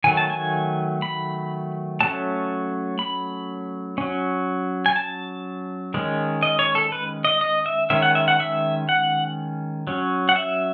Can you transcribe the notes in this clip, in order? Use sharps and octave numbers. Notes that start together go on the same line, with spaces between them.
D#3 F#3 A3 G#5
A5
G#5
B5
F#3 A3 C#4 A5
B5
F#3 C#4
G#5
A5
D#3 G#3 C#4
D#5
C#5
A4
B4
D#5
D#5
E5
D#3 G#3 C#4 E5
F#5
E5
F#5
E5
F#5
F#3 C#4
F#5
E5